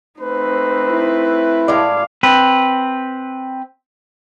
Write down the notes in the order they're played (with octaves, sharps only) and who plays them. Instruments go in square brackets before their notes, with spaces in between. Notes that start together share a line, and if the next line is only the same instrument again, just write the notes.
[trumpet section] A3 C4 B4 [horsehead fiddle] D#4 C5
[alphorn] E4
[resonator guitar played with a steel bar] A2 G#3 D5 [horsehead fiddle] F5
[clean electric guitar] C4 B4